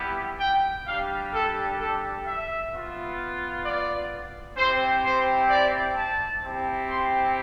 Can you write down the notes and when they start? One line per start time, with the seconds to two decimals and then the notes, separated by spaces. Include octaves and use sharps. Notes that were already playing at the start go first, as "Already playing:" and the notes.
Already playing: G3 B3 E4 G4
0.38 G5
0.85 G3 D4 G4 F5
1.32 A4
1.78 A4
2.24 E5
2.71 B3 F4
3.64 D5
4.56 C4 E4 G4 C5
5.04 C5
5.49 D5
5.96 A5
6.43 C4 E4 G4
6.89 C6